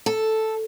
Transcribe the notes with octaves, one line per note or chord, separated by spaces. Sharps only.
A4